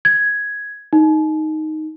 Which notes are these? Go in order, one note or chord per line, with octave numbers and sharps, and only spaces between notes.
G#6
D#4